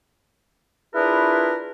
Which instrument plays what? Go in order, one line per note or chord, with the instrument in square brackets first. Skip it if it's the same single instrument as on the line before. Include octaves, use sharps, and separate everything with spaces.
[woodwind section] D4 E4 F4 G#4 A#4 B4